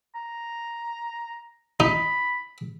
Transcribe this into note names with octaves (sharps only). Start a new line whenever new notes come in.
A#5
D#4 B5